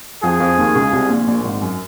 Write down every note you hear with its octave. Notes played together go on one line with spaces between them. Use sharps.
F2 F3 G#4
F2 F3
D#2 D#3
C#2 C#3
C2 C3
A#1 A#2
A#1 A#2
A#2
G#1 G#2
F#2